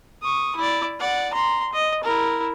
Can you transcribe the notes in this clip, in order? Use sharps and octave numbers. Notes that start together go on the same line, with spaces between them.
C#6 D#6
E4 D5
D5 F#5
A#5 C6
D#5
E4 A#4